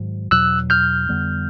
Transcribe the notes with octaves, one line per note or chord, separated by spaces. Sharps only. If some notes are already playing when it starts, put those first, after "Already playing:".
Already playing: G#2 D#3 F#3
E2 B2 F#3 E6 F#6
F6 G6
F2 D3 G3 B3